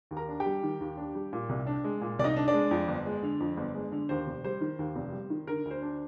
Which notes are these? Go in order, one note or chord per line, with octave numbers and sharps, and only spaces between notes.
D#2
A#4 A#5
D4
G4 G5
G3
D#3
D#2
D4
G3
A#2
C2
D4
G#3
A#2
C2 D5
D#4 D#5
D4
D4 D5
G#3
F2
G1
G#3
D3
F2
G1
G#3
D3
D#2 C5
F1
G3 C5
D#3
D#2
F1
G3
D#3
D3 A#4
D2
C5
D4